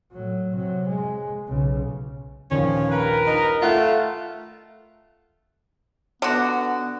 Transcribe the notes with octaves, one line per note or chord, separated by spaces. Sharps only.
A2 F#3
C3 F#3
G#3
B1 C#3
A#1 D#2 F3 C#4
G2 A#4 B4
D#4
A3 F4 E5 F#5 F#6
D3 B3 F#4